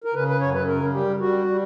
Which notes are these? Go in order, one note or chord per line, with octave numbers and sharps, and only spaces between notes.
A#4
C#3 B4
B4
F#2 C#5
B4
C#3 A#4
G3 G4
G3 F#4
G3